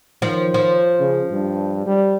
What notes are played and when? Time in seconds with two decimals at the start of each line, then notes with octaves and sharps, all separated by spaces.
0.22 D#3 F3
0.54 F3
0.99 C#3
1.32 G2
1.86 G3